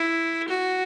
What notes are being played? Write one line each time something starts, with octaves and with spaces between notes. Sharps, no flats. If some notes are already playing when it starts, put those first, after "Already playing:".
Already playing: E4
F#4